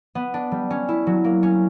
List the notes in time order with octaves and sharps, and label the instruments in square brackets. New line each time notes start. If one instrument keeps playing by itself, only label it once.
[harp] B3
D4
G3
C#4
E4
F#3
A#3
C#4